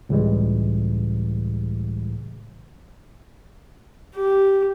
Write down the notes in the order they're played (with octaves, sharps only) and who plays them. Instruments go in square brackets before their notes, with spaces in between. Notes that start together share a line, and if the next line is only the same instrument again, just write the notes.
[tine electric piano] C#2 A2 C#3 E3 G3 G#3
[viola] G4